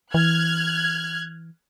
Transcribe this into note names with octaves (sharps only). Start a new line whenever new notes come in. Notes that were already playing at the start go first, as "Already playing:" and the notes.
E3 F6 F#6 G#6